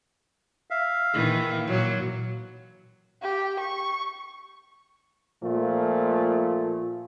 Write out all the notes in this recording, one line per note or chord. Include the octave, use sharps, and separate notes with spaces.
E5 F5
A#2 D#3 E3
A#2 F#3
G4
C#6
A#2 F3 A3 F4